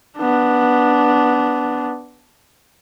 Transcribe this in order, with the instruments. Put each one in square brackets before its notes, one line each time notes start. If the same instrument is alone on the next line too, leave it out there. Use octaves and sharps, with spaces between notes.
[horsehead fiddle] B3 D4